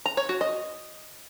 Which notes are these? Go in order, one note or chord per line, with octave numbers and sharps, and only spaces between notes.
A#5
C#5
F#4
D#5